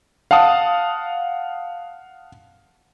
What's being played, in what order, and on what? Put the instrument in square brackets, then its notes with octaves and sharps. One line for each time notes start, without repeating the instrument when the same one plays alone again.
[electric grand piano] F5 F#5 A5 D#6